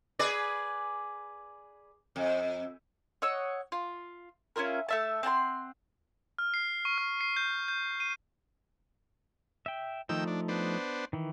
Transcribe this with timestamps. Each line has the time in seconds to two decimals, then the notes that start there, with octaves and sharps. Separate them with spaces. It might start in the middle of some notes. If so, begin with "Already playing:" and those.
0.19 G#4 B4 D5
2.16 F2
3.22 C#5 D#5 F#5 E6
3.72 F4
4.56 C#4 E4 F4 A#4
4.89 A3 E5 A5
5.23 C4 F#5 A5 C6
6.39 F6
6.54 C7
6.85 C#6
6.98 F6
7.21 C7
7.37 G6
7.68 G6
8.00 D#7
9.66 E5 G5
10.09 D#3 F3 A3 D#4 G5 E6
10.27 D4
10.48 B3 D4 C5
11.13 D#3 E3